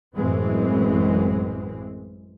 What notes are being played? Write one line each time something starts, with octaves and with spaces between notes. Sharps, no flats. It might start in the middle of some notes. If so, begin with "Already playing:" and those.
A1 F#2 E3 G#3 C4